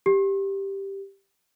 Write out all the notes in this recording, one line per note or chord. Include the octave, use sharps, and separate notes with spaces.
G4